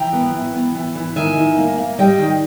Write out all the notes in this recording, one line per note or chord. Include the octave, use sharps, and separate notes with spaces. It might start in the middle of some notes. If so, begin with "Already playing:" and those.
Already playing: E3 G5 A#5
B3
E3
B3
E3
E3
D#3 E5 G#5
D#3
A#3
A#3
G3 D#5 G5
D#3